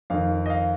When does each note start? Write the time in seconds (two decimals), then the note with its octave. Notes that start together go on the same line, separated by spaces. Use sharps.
0.10 F2 D#3 F5
0.46 D#5
0.50 F5